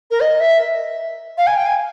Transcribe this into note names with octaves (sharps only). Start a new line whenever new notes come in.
A#4
D#5
E5
F5
G#5
G5
G#5